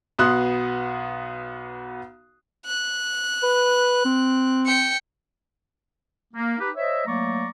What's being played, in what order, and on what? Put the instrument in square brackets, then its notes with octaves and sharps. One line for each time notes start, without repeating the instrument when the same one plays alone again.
[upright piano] B1 B3 F#4 C6 D#6 F#6
[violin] F#6
[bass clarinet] B4
C4
[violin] G5 C#7
[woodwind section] A#3
D#4 G4 B4
C5 C#5 D#5 E5
F#3 A3 A#3 D5 A#5 C#6